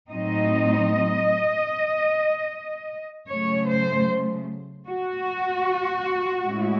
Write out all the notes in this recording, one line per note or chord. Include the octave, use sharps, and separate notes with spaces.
A2 F#3 C4 D#4 D#5
C#3 F#3 A3 C#5
C5
F#4
A2 G#3 C#4 E4